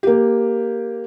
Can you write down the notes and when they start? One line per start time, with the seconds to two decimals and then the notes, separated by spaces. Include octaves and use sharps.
0.03 A#3 G4